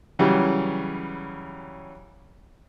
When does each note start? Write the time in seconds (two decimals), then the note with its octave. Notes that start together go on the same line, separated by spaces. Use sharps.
0.19 C#3 E3 F#3 G3